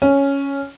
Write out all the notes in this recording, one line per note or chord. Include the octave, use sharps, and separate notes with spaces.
C#4